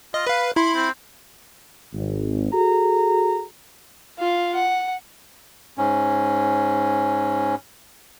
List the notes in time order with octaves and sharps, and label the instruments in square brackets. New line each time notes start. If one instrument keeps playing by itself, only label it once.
[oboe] F4 [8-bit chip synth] D#5
[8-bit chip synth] B4 F5 [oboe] B5
[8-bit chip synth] E4 B5 [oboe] C6
[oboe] C4
[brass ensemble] G#1
F#4 G#4 A4 A#5
[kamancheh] F4 F5
F#5
[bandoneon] G#2 C#4